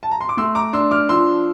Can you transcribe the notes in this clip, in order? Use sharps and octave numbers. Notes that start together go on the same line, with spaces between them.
A5
A#5
C6
D6
A3 C6 E6
A#5 D6
D4 C6 E6
D6 F6
F3 C6 E6